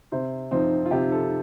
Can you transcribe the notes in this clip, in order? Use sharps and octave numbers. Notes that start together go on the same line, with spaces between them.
C3 C5
F3 C4 D#4 F4
F4
C3 G4
A4